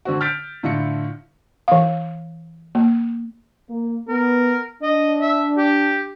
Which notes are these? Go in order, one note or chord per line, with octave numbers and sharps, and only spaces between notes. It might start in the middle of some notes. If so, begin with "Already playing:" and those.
D3 C4 F#4
F6 G6 A6 B6 D7
A2 D3 E4 F4 A#6 C#7
E3 F5
A#3
A#3
B3 A#4
D4 D#5
E5
G4